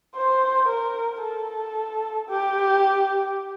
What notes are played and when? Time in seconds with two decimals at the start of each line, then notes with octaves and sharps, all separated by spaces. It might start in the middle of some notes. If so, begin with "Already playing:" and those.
0.16 C5
0.69 A#4
1.23 A4
2.29 G4